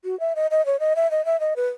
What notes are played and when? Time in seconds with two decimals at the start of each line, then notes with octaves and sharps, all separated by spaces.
0.04 F#4
0.20 E5
0.36 D#5
0.51 D#5
0.66 C#5
0.80 D#5
0.96 E5
1.11 D#5
1.25 E5
1.40 D#5
1.56 B4